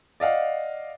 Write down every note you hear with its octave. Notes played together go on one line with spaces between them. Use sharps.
D5 D#5 F5 F#5